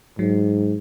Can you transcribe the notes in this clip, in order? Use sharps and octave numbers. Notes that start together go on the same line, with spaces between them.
G#2 F#3